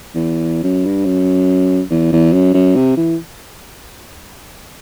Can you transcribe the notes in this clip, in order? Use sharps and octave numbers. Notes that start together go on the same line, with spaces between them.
E2
F#2
G2
F#2
E2
E2
F#2
F#2
C3
E3